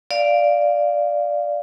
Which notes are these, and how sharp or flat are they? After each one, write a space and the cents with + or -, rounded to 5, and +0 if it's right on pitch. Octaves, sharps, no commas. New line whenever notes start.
D5 +0 F5 -5